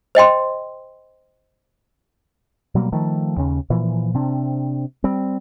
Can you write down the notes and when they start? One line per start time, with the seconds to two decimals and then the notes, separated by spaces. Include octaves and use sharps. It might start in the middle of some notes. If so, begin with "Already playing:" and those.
0.15 C5 D#5 G5 C6
2.75 B2 F#3 G3 A#3
2.92 D#3 F3 A3
3.37 D#2 C#3 C#4
3.70 A#2 E3 F3
4.14 C3 C4 D4
5.04 G3 C4